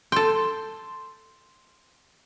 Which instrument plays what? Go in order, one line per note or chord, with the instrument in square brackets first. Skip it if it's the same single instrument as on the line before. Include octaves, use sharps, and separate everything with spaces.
[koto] A4 G5 [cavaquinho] C6